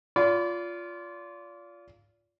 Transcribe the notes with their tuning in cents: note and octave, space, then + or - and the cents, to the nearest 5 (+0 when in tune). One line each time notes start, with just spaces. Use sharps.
F4 +0 D5 -35 B5 +30